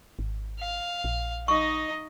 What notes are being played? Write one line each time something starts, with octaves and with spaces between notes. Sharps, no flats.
G#1
F5
A#1
D#4 D#5 C#6